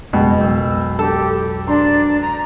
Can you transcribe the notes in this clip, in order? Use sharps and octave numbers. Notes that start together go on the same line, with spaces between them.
F#1 F2 B2 G#3 G5
B1 E6 G6
G4 A4
D4 C5 A#5 C6
A#5